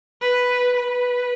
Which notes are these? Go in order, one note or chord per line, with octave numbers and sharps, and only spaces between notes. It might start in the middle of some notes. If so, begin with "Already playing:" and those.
B4
B4